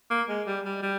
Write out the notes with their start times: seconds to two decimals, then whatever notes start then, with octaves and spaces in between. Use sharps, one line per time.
0.10 A#3
0.29 G#3
0.47 G3
0.65 G3
0.83 G3